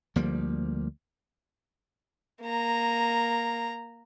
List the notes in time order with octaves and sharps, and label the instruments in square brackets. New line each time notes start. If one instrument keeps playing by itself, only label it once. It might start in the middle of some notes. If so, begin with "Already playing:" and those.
[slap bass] D2 F3 G3 A#3
[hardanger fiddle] A#3 A#5